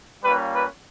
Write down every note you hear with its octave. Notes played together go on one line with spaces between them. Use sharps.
G3 A#3 C#4 F4 B4
B4